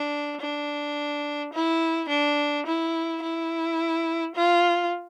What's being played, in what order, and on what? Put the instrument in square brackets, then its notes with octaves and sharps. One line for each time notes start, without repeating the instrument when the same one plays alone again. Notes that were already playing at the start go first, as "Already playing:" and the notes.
Already playing: [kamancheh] D4
D4
E4
D4
E4
E4
F4